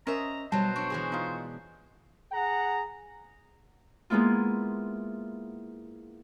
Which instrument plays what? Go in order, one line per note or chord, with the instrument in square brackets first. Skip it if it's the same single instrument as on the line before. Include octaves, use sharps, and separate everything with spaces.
[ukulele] C#4 A#4 C5 [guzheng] D#5 E5 [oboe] A#5
[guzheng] B2 F#3 [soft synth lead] G3 [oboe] C5 [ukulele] A5
[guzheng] D4 [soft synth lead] C#6
[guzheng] E3 G#3 G#4
[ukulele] D#4 F4
[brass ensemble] G#4 F#5 A#5
[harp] G#3 A#3 B3 E4 F4